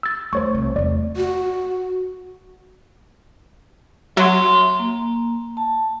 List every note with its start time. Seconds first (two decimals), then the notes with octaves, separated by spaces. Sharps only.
0.03 E6 A6
0.33 D#2 A3 C5 C#5 C#6
0.55 C2
0.76 E2 A3 D5
1.16 F#4
4.17 F#3 E5 C6
4.79 A#3
5.57 A5